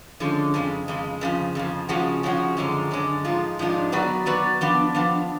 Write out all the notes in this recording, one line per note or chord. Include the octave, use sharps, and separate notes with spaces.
D3 F3 G#3 C#4
F2 C#3 G#3
F2 C#3 G#3
F2 C#3 F3
F2 C#3 F3
C#3 F3 G#3 C#4 F#4
C#3 F3 G#3 C#4 F#4
F#2 D3 F3 G#3 C#4
F#2 D3 G#3 C#4
G#2 F3 G#3 F4
G#2 F3 G#3 D4 F4
F#3 B3 F#4 B4 D5
F#3 B3 F#4 B4 D5
F3 B3 D4
F3 B3 D4